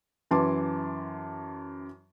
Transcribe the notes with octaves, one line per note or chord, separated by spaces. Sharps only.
F#2 E3 A5 C6 D6